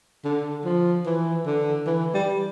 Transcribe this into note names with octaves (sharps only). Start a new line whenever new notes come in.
D3
F3
E3
D3
E3
G3